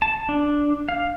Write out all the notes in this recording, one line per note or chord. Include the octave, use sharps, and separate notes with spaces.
A5
D4
F5